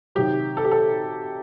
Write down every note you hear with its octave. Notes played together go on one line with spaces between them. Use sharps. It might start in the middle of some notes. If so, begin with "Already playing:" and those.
C3 D#3 F#3 G4
A4
G4
A4